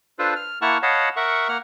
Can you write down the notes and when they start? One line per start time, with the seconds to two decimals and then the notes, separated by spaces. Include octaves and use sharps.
0.19 D4 F4 A4 B4 C5
0.36 F6
0.62 A#3 E4 F#5 A5 C#6 F6
0.83 C#5 D#5 F5 F#5 A5 B5
1.16 A#4 E5 F#5 C#6
1.49 A#3 F#5 F6